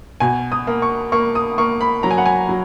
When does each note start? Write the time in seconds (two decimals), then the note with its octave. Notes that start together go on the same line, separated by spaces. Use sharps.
0.20 B2 G#5
0.52 D#6
0.67 A#3
0.82 C#6
1.12 A#3 C#6
1.35 D#6
1.58 A#3 C#6
1.81 B5
2.03 F#3 A#5
2.11 G#5
2.18 F#5
2.26 G#5
2.49 F#3